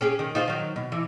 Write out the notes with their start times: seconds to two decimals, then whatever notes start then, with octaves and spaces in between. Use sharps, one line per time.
0.01 C#4 G4 G#4
0.19 D#3
0.35 D#4 F4 C5
0.48 D#3 F#3
0.76 B2
0.92 E3